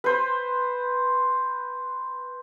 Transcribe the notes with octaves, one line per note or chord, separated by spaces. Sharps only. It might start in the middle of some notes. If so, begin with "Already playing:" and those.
B4 C5